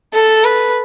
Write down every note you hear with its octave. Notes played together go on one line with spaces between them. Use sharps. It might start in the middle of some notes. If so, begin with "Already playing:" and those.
A4
B4